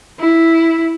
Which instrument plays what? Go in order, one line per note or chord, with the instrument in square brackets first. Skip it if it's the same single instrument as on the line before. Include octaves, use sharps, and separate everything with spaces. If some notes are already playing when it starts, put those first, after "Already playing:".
[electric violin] E4